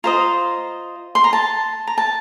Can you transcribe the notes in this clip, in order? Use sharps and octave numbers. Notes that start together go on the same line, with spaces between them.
F4 C5 D#5 A#5
C6
A#5
A5
A#5
A5